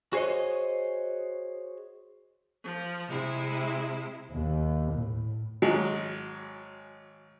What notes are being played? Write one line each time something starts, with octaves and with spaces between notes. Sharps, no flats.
F#4 G#4 C5 C#5 D#5
F3
C3 G#3 E4
D#2
A2
G#1 F#3 G#3